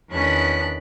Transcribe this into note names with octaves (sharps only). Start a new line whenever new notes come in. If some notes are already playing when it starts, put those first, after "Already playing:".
E2 D#3 C#4 D4 B5 F#6